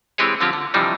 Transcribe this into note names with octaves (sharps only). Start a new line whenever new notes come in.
E3 G#3 C4 G4 G#4 C#5
D3 F3 C4 C#4 F4 G4
D3
C3 E3 F3 G3 D4 D#4